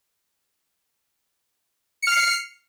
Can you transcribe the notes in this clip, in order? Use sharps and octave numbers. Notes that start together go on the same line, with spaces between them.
F6 C7 C#7